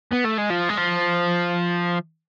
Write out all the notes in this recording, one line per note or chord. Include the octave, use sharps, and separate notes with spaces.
B3
A3
G#3
F3
G#3
F3